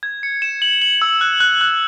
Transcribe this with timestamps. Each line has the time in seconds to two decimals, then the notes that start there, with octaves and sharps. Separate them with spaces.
0.03 G#6
0.23 C#7
0.42 E7
0.62 F#7
0.82 F#7
1.02 E6
1.21 F#6
1.40 F#6
1.61 F#6